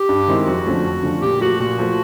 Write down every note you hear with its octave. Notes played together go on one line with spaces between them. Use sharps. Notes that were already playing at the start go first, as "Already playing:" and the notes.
Already playing: G4
G2
D#3 G#3 C4 E4
F2 F#4
D3 F3 A3 C#4
F2
D3 F3 A3 C#4
A#2 G4
F3 A3 F#4
A#2 F#4
F3 A3